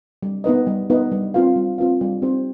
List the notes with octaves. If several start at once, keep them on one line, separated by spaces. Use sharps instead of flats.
G3
B3 D#4 B4 D#5
G3
B3 D#4 B4 D#5
G3
C4 F4 B4 F5
G3
C4 F4 B4 F5
G3
C4 D#4 G4 C5